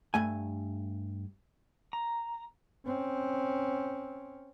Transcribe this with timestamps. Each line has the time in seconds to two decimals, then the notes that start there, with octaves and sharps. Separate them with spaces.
0.14 G2 A3 G#5
1.93 A#5
2.86 C4 C#4